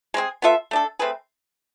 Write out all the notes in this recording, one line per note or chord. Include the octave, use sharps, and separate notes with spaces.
G#3 C4 G#4
B3 F4 A4 E5
A3 D4 A4
A3 C4 G#4 B4